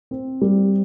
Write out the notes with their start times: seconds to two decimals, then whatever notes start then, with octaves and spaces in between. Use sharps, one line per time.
0.11 C4
0.41 G3